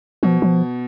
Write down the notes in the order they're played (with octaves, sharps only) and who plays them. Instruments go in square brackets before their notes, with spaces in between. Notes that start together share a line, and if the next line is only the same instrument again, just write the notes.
[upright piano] B2 [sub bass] F3
[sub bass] F3